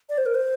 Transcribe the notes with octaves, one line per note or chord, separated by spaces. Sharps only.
D5
C5
A#4
C5